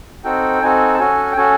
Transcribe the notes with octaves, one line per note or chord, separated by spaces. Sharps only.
C4 D#4 F#4 A4 G5
C4 D#4 F#4 A4 G#5
A5
C#4 F#4 A4 G#5
G5
C#4 F#4 A4 G#5